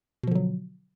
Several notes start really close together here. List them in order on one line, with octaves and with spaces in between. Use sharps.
B2 F3 D3 F#3